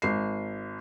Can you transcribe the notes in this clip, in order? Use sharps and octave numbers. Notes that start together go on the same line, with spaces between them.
G#1 C7